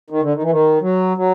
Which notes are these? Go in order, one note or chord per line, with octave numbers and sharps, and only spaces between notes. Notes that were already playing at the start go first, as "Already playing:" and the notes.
D#3
D3
D#3
E3
D#3
F#3
F#3